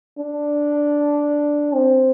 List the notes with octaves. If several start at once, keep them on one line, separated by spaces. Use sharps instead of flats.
D4
C4